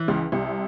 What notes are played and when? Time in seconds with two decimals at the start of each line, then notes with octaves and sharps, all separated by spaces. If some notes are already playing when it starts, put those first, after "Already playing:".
Already playing: E3
0.08 C#2 C#3
0.32 C2 C3